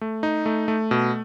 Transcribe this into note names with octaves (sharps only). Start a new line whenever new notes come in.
A3
D#4
A3
A3
B2